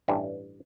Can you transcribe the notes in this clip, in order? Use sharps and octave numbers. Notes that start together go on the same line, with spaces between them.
A1 G2 E3 G3